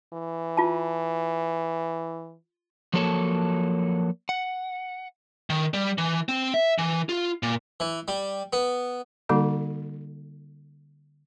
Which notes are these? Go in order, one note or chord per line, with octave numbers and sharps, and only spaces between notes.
E3
F4 A5
F3 F#3 A#3 A4 C#5 A5
F#5
D#3
G3
E3
C4
E5
E3
F4
A#2
E3
G3
B3
D3 G3 A#3 D#4 F#4 A4